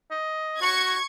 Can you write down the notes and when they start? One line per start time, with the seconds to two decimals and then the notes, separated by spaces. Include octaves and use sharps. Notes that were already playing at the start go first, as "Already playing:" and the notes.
0.11 D#5
0.61 F#4 C#6 G#6